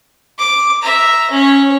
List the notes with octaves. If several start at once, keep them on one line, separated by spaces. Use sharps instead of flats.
D6
E5 A#5
C#4 C#5